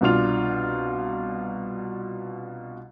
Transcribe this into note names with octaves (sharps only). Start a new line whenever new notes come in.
C2 B2 D4 F4 F7